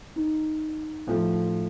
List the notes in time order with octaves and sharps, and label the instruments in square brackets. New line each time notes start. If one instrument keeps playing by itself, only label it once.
[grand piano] D#4
A2 F3 A3